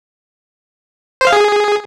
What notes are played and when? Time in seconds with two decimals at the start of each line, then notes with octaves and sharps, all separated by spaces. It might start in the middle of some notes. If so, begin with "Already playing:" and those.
1.21 C5
1.27 F5
1.33 G#4